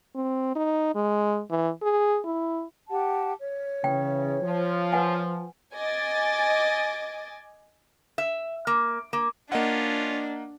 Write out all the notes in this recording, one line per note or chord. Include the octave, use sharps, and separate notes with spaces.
C4
D#4
G#3
E3
G#4
E4
G4 F#5 A5
C#5
C#3 E3 G5
F3
B4 F#5 G#5
D#5 G#5 D6 A6
E5
A#3
A#3
A#3 C#4 D4 F4 D#5 F#5